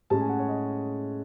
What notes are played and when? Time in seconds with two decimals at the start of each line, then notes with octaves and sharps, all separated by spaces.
0.10 A2 G#3 C#4 A5
0.21 G#5
0.29 F#5
0.39 C#5
0.49 D#5